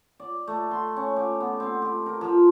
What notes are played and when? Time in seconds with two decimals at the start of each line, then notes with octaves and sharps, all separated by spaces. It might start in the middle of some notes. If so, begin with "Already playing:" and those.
0.20 D5
0.47 A3
0.71 C6
0.97 C#4
1.16 G4
1.40 B3
1.60 C4
1.82 G4
2.06 A#4
2.21 F3